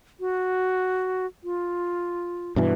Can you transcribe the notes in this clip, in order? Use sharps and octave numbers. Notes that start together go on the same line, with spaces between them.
F#4
F4
G2 B2 E3